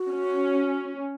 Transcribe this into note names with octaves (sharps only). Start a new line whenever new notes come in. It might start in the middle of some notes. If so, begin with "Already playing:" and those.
Already playing: F#4
C#4